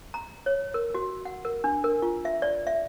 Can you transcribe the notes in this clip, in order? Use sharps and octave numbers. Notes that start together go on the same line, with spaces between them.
A#5
C#5
A#4
F#4
F#5
A#4
D4
A#4
F4
E5
D5
E5